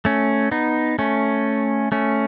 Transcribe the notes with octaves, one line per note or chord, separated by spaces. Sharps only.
A3 C#4
B3 D#4
A3 C#4
A3 C#4